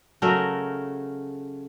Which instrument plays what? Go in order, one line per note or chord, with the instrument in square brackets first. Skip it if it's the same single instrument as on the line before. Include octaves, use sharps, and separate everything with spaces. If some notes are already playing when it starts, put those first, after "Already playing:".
[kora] C#3 F#3 A3 A#4